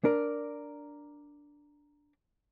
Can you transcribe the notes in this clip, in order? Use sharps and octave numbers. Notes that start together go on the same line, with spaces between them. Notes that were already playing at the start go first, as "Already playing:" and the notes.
D4 A#4 D5